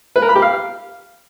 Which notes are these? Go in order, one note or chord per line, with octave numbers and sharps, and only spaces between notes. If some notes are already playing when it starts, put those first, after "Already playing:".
B4
A#4
B5
G4
F5